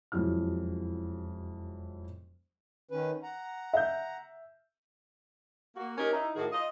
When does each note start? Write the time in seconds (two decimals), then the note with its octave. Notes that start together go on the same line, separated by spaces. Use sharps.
0.12 E1 F2 F#3 E4 F6
2.90 D#3 C#4 B4
3.23 F#5 A#5
3.73 E5 G6
5.76 A#3 F#4
5.98 C#4 D#4 G4 A#4
6.13 D#4 E4
6.35 A2 D#3 F#4 G#4 A#4
6.51 F4 D#5